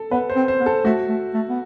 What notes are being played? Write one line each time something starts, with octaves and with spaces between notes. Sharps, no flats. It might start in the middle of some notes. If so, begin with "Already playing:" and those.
Already playing: A4
B3 B4
C5
C4
C5
B3
A4
A3 F#4
A3
A3
B3